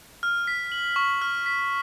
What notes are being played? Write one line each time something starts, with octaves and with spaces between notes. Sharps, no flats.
F6
B6
F#7
C#6
F6
B6